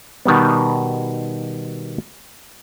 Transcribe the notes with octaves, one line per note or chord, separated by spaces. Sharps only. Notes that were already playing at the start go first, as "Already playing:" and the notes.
B2 D#3 G3 B3